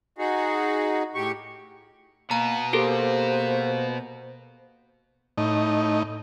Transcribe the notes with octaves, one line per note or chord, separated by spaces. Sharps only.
D#4 F#4 G#4
A2 G4 C#6
B2 A#3 B3 A#5
A#3 G4 A4 A#4 C5
A2 D#4